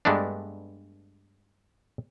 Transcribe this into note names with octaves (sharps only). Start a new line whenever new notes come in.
G2 G#3 A3 B3 D4